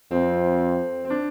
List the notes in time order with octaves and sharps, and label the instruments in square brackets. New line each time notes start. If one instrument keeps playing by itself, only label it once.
[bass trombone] F2 [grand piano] C4
[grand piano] C4
D4